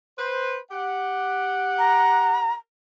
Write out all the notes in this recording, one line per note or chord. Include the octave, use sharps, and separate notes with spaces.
B4 C5
G4 F#5
A#5